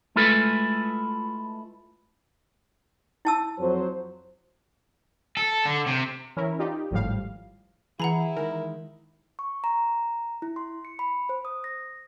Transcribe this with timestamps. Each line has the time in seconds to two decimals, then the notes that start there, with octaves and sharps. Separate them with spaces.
0.16 G#3 A3 E4 F4 A4 B4
3.25 E4 A5 E6
3.58 F2 F#3 C5
5.37 A4
5.65 D3
5.86 C3
6.37 E3 C#4 E4 A#4
6.59 D#4 F4 G4 D5
6.91 G#1 A2 F3 G3 F5
8.00 E3 E4 G#4 F#5 A#5 B5
8.37 D#3 E3 G#3 A#4
9.39 C#6
9.64 A#5
10.42 E4
10.56 C6
10.85 C#7
10.99 B5
11.29 C5
11.45 D#6
11.64 A#6